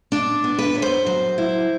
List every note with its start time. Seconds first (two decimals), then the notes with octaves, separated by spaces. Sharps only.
0.12 D4
0.44 B3
0.59 B4
0.75 F#2
0.82 C5
1.06 F#3
1.38 E4